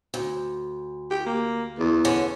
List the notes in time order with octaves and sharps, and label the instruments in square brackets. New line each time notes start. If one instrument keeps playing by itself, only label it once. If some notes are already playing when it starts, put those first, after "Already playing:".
[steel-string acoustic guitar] D2
[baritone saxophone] G4
A#3
E2
[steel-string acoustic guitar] D3 C#4